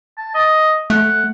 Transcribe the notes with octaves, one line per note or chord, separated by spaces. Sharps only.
A5
D#5
A3 F#5